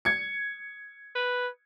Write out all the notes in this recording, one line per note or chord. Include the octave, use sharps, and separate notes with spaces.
G#6 C#7
B4